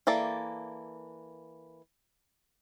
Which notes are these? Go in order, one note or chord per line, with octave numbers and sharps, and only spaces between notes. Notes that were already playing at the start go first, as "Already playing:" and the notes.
E3 A#3 A4 D5